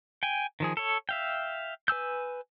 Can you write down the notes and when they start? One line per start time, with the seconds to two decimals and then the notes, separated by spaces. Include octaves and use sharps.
0.23 G5 G#5
0.60 D#3 F3 G#4
0.77 A4 C#5
1.09 E5 F5 G5
1.88 B4 G#5 E6 G6